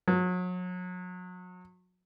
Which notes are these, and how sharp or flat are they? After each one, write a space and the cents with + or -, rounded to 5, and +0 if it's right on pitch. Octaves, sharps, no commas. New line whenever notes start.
F#3 -35